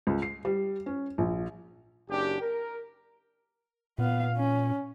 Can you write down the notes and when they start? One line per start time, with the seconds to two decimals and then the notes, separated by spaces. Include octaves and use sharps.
0.07 C#2
0.22 C7
0.45 G3
0.86 C#4
1.18 A#1
2.09 F#1 D4 G4
2.41 A#4
3.98 A#2 B3 F5
4.36 C#4